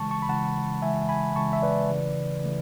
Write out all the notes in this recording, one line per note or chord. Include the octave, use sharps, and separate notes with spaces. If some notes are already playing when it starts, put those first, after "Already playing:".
Already playing: C#3 E3 G#3 A5 C#6
A5 C#6
B5
C#3 E3 G#3 F#5 A5
C#3 E3 G#3 E5 G#5
G#5 B5
C#3 E3 G#3 A5 C#6
E5
B4 D5
C#3 E3 A3
C#3 E3 A3